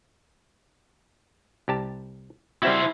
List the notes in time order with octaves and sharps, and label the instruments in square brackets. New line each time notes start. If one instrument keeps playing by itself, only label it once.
[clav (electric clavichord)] C2 G4 A5
[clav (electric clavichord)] G3 C4 F#4 [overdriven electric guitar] E4 C5